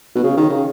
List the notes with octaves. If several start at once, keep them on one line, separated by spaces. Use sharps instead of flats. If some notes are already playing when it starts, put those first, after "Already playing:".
B2
C#3
D#3
C#3